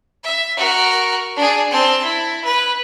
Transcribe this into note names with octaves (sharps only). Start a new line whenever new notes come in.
E5
F#4 A#4
D4 G#4
C4 A5
E4
B4